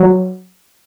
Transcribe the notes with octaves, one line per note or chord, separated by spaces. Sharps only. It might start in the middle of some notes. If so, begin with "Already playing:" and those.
Already playing: F#3